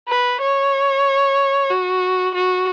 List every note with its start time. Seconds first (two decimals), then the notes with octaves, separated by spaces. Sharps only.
0.09 B4
0.41 C#5
1.70 F#4
2.35 F#4